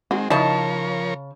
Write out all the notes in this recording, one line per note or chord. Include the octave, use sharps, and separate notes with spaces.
D#3 G#3 C4 F#4
C#3 F3 D#4 E4 A#4 C#5 D#5 A5